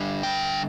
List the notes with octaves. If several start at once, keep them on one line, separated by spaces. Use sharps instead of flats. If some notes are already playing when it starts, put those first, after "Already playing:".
Already playing: D3 G3 D4
G5